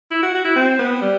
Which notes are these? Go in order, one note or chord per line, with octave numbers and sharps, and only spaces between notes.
E4
F#4
F#4
E4
C4
B3
G3